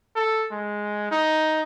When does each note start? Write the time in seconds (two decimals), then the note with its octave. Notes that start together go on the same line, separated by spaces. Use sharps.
0.15 A4
0.51 G#3
1.11 D#4